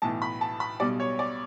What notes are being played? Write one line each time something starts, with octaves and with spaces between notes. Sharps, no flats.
B1 A2 E3 A5
B5
A5
B5
B1 B2 G3 D5
C#5
D5